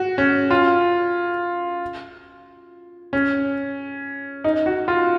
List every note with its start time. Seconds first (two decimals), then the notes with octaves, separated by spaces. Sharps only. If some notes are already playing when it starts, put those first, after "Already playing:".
Already playing: F#4
0.18 C#4
0.51 F4
3.13 C#4
4.44 D#4
4.66 F#4
4.88 F4